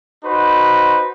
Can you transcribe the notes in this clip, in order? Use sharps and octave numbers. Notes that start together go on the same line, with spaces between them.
D#4 F#4 B4 C5